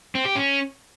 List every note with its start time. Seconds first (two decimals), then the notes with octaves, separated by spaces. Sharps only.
0.15 C4
0.25 G4
0.36 C#4